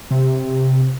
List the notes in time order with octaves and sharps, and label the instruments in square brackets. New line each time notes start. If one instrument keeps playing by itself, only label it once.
[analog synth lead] C3